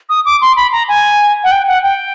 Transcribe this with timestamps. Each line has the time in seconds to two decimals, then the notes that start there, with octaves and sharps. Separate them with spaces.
0.09 D#6
0.25 D6
0.41 C6
0.56 B5
0.72 A#5
0.88 G#5
1.44 F#5
1.51 G5
1.67 F#5
1.83 G5